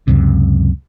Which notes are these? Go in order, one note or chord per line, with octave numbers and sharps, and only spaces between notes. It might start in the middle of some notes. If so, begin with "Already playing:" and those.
C#2 F#2 C3